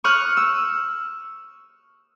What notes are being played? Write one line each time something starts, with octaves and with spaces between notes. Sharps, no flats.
C#6 D#6 F6 F#6
E6